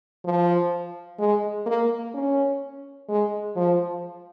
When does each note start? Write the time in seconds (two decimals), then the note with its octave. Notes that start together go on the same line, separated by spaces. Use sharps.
0.24 F3
1.19 G#3
1.66 A#3
2.14 C#4
3.09 G#3
3.56 F3